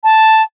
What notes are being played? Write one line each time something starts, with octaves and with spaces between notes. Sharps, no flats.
A5